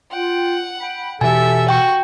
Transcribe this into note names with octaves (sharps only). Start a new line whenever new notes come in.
F4 F#5 G5
G5 B5
B2 E3 G4 A4 E5 G#5
F#4 G5 C#6